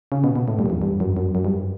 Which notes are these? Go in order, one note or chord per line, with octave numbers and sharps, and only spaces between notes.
C#3
B2
B2
A2
G2
F#2
E2
G2
F#2
F#2
F#2
G2